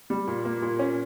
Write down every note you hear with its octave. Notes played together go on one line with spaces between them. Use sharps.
G3
A#2
A#3
A#2
C#4